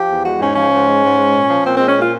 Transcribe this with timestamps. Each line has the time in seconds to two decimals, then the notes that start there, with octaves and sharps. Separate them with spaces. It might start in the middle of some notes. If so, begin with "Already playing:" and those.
Already playing: F3 G4
0.10 E2
0.25 G#3 F#4
0.41 G#2 C#4
0.56 F3 C#4
0.72 G#2
0.87 G#3
1.03 G#2
1.18 G#3
1.34 A#2
1.49 F3
1.65 A#2 C4
1.76 G#3 C4
1.88 C#4
1.97 A#2 F4